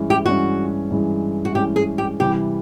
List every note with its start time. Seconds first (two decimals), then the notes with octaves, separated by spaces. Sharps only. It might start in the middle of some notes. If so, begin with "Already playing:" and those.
Already playing: G2 E3 G#3 C#4
0.10 G4
0.26 G2 E3 G#3 C#4 F#4
0.91 G2 E3 G#3 C#4
1.45 F#4
1.55 G2 E3 G#3 C#4 G4
1.76 G#4
1.98 G4
2.19 C3 E3 G3 G4